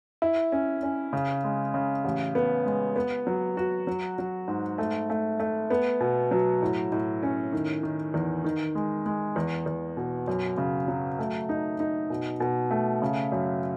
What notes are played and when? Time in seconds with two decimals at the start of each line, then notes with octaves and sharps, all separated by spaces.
0.22 E4
0.52 C#4
0.83 C#4
1.13 C#3
1.44 G#3
1.74 C#3
2.04 A1
2.35 B3
2.66 G#3
2.96 B3
3.27 F#3
3.57 F#4
3.87 F#3
4.18 F#3
4.48 G#2
4.78 A3
5.10 A3
5.40 A3
5.70 B3
6.00 B2
6.31 F#3
6.62 A2
6.92 A2
7.23 C#4
7.52 D#3
7.83 D#3
8.14 E2
8.44 D#3
8.75 G#3
9.06 G#3
9.36 E2
9.66 E2
9.97 B2
10.28 F#2
10.58 C#3
10.88 F#3
11.19 A3
11.49 D#4
11.80 D#4
12.10 B2
12.40 B2
12.71 A3
13.02 C#3
13.32 F#2